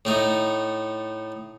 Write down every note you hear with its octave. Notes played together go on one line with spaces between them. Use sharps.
A2 A3 D#4